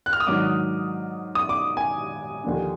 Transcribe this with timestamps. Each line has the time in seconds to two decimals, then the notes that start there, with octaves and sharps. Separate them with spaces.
0.06 F#6
0.13 F6
0.20 D#6
0.27 G#2 D#3 F#3 D4 D6
1.35 D#6
1.49 D6
1.77 G#5
2.44 D#2 D3 F3 A#3 D4